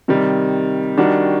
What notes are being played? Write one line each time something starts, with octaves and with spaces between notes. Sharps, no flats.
C3 D#3 G3
D#3 G3 D4 F#4